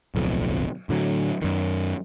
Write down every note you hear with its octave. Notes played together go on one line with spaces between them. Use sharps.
D1 B1 F2
A2 D3 F#3
F#2 D#3